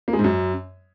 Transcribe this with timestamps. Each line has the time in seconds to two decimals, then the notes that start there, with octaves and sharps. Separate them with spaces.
0.08 A#3
0.13 G#3
0.19 G#2
0.24 F#2